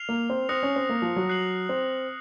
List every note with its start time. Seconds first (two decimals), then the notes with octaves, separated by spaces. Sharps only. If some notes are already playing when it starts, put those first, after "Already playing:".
Already playing: F6 C7 F7
0.09 A#3
0.30 C4
0.49 C4 D#6 F#6 A#6 C#7
0.63 C#4
0.76 C4
0.89 A#3
1.02 F3
1.16 F#3
1.29 F#6 C7 F#7
1.69 C4